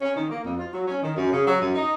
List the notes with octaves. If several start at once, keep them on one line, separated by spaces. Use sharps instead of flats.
C#4
D#3
A#3
F2
F4
F#3
C#4
D#3
F#2
C#3
F#3
F#2
D#4